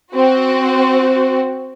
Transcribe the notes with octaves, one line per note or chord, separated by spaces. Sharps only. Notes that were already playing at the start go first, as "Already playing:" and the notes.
C4 F#4